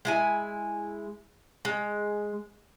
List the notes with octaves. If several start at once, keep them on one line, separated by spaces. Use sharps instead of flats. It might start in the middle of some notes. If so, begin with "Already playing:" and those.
G#3 E4 G#5
G#3